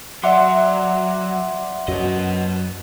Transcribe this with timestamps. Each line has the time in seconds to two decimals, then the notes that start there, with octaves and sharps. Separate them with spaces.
0.23 F#3 D5 E5 F#5 C6 D6
1.88 F#2 F#3 B4 D#5